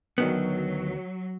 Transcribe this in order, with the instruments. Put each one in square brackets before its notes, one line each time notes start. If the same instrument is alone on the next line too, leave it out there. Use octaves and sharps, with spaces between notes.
[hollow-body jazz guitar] D2 D#3 B3 [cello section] F#3